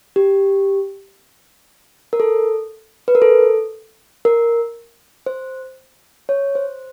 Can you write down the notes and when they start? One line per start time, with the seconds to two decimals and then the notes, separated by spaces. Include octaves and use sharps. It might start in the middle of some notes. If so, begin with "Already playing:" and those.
0.16 G4
2.13 A#4
2.20 A4
3.08 B4
3.15 A#4
3.22 A4
4.25 A#4
5.26 C5
6.29 C#5
6.55 C5